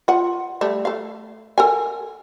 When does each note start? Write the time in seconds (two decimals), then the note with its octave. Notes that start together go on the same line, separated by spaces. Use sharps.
0.08 F4 F#5
0.61 G3 A3
0.85 A3 F5
1.58 A4 A#4 G#5